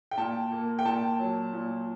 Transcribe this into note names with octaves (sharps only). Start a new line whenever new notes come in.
G5
A#2 A5
A#3
G5
A#2 A5
F#3
A#2